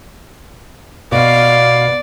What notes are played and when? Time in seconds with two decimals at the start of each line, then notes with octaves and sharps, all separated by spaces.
1.12 B2 D5 F5